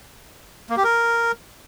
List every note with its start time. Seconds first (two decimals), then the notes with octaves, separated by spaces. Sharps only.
0.70 A#3
0.77 G4
0.84 A#4